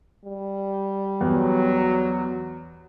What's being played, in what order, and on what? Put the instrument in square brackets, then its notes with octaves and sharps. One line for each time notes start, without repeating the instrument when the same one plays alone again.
[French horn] G3
[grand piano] E2 [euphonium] F#3